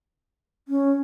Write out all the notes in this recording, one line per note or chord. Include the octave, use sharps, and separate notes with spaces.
C#4